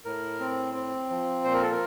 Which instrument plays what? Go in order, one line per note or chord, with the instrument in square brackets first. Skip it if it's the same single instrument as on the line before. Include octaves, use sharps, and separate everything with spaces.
[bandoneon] A2 A#4
C4
C4
F3
A#2 C5
A#4
A4
A#4